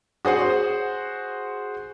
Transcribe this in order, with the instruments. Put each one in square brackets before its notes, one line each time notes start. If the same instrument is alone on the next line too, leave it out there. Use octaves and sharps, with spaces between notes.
[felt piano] F#4 G#4 C5 F#5